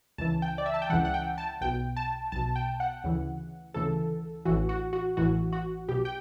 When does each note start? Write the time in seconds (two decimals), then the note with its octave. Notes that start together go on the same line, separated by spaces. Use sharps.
0.18 C#2 C#3 E3 A5
0.42 G5
0.58 D5
0.66 E5
0.74 A5
0.82 G5
0.90 C#2 C#3 E3 F#5
1.05 F#5
1.14 G5
1.38 A5
1.61 B1 B2 G5
1.96 A5
2.32 B1 B2 A5
2.56 G5
2.80 F#5
3.04 D2 C#3 E3
3.74 D2 C#3 E3 A4
4.45 A1 A2 E3 F#4
4.69 F#4
4.93 F#4
5.17 A1 A2 E3 F#4
5.53 F#4
5.89 B1 B2 G4
6.05 G5